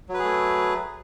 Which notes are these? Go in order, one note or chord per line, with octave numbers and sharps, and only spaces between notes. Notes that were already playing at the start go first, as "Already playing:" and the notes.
F#3 A3 G#4 B4